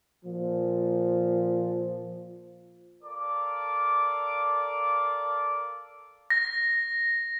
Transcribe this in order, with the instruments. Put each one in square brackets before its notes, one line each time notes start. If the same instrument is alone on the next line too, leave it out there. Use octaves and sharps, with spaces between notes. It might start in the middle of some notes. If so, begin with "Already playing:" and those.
[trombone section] A#2 F3
[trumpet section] A4 A#4 D5 F5 D6
[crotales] A#6